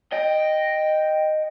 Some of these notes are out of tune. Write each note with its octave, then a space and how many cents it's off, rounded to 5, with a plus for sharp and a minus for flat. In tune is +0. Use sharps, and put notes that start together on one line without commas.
D#5 -5 G5 +0